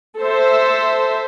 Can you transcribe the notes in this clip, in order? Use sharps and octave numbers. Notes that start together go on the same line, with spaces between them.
A4 C5 E5